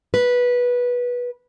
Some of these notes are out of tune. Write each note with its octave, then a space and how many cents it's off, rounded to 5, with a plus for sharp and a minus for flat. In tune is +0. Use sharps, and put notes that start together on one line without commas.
B4 -15